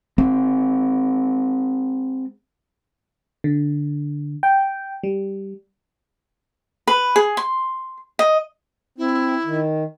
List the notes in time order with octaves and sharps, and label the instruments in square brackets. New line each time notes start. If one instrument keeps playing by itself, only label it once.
[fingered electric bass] G#3 C4
[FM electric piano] D3
G5
G3
[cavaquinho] B4
G#4
C6
D#5
[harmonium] C4 [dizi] E4
[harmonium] D#3